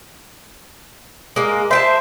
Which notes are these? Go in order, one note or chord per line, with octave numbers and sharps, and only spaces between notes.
G#3 A#3
C5 E5 G5 A5